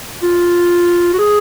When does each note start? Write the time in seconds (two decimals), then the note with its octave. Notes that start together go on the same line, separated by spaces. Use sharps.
0.22 F4
1.13 F#4
1.19 G#4